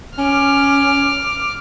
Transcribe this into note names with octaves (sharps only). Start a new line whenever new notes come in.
C#4 D6 F6